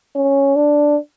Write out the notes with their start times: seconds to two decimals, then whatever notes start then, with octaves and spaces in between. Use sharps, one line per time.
0.16 C#4
0.56 D4